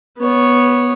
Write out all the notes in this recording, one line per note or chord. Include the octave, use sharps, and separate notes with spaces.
B3 C#5